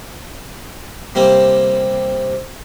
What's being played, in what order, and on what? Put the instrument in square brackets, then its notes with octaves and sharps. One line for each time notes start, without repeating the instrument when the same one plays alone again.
[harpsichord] C3 G3 A#3 C4